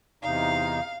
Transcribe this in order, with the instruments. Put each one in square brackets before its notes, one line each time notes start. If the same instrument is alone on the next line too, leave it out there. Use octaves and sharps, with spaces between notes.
[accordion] E2 C3 D#4 [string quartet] F5